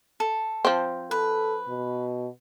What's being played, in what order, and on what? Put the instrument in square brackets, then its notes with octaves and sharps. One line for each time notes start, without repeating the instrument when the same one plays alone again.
[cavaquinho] A4
[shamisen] F3 C4
[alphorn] A4 [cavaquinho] B4
[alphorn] B2